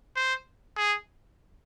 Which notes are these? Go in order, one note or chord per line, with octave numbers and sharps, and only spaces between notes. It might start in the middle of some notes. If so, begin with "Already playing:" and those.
C5
G#4